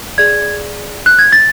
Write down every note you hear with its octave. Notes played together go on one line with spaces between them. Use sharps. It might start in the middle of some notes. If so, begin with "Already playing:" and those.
G#4 D5 G#6
F#6
G#6
A6